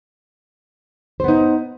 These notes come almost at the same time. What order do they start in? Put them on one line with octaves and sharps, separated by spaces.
C5 B3 D#4